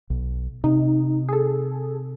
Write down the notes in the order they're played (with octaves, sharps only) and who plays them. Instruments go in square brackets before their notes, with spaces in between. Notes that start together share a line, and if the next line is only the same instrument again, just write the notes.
[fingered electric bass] B1
[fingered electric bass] C3 [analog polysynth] D#4
[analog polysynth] G#4 A4